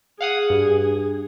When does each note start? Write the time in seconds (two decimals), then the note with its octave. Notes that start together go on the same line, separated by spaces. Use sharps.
0.21 G#4 F5 F#5 D#6
0.50 G2